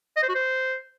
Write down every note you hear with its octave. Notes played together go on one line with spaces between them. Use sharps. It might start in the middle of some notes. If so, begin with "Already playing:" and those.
D#5
C5
F#4
C5